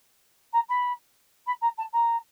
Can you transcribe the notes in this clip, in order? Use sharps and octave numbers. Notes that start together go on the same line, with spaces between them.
A#5
B5
B5
A#5
A5
A#5